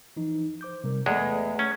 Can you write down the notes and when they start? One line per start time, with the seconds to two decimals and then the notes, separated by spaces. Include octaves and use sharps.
0.17 E3 F3 D#4
0.61 C5 D6 G6
0.84 C3 G3 A#4
1.06 E2 G#3 A3 B4 D#5
1.59 C#4